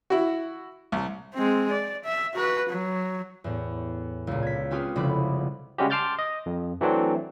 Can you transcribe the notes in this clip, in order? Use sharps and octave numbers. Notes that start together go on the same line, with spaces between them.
E4 F#4
C2
G#3 C4
D5
E5
F#4 B4
F#3
E2 A2
C#2 A#2
G#6 B6
C4 C#4 F4 G4 G#4 B4
F1 C2 C#3 B5 D6
C#3 G3 G#3 C#4 F#4 G4
A5 C6 D6 F6 G6 A6
D#5
F2
E3 F#3 A3 C4 D4